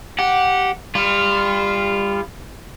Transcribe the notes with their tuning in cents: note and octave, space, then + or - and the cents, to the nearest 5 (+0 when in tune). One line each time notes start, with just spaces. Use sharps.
G4 -10 F#5 -10
G3 +30 F4 -10